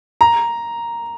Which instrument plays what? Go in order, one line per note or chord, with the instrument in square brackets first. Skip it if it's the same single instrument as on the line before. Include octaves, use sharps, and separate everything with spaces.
[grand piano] A#5